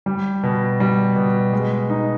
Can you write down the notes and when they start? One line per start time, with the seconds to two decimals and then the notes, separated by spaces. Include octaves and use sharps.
0.06 G3
0.43 B2
0.80 G3
1.16 B2
1.53 G#3
1.90 D#4